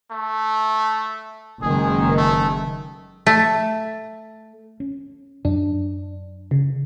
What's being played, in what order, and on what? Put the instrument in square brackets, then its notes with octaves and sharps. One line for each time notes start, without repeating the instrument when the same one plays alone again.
[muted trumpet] A3
[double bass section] F#1 D#3 G#3 [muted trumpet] G#4
[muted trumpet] A3
[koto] A3
[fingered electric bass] C#4
[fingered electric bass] F#2 [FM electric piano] D4
[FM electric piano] C#3